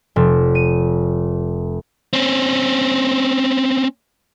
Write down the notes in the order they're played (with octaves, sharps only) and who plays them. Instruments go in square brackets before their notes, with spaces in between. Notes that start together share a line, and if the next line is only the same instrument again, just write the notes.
[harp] F1
D#7
[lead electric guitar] C4 C#4